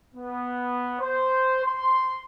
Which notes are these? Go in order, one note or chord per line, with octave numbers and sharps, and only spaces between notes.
B3
C5
C6